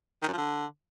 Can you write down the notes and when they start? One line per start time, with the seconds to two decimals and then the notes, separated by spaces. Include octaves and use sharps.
0.22 D#3
0.28 F#2
0.33 F3
0.38 D3